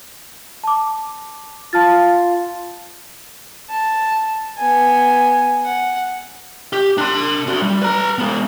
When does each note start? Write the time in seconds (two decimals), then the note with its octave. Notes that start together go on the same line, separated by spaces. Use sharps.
0.64 A5 D6
1.73 F4 A5 F6 A6
3.70 A5
4.58 B3 G#5
5.63 F#5
6.73 G4
6.98 D4 C6
7.47 D4 F#4
7.62 G3
7.82 B4 A#5
8.18 G#3 B3